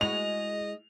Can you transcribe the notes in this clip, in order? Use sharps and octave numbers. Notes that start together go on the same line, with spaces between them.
G#3 E4 F#4 D#5 F7